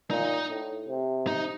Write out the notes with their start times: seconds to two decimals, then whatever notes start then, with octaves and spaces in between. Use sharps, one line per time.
0.10 A#2 D#4
0.50 A2
0.89 C3
1.27 D#4